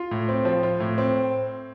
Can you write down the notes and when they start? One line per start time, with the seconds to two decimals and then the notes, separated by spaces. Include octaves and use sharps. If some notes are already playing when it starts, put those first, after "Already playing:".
Already playing: F4
0.11 A2
0.29 C4
0.45 F3
0.63 F4
0.80 A2
0.98 C4